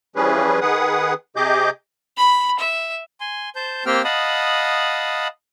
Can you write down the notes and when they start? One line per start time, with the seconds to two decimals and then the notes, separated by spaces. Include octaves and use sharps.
0.16 E3 F3 G3 C#4 G#4 B4
0.61 D#3 G#4 B4 F#5 D#6
1.36 C3 G4 G#4 D#5 D6 G6
2.17 B5
2.59 E5
3.20 G#5 C6
3.55 C5 A5 G6
3.86 A#3 C4 G4 C5 G5 F6
4.04 D#5 F5 F#5 A5 B5 D#6